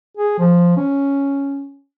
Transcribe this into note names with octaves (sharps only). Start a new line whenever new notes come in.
G#4
F3
C#4